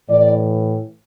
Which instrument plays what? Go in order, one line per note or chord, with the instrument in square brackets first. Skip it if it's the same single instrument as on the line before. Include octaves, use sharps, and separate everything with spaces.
[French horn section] A2 E3 D5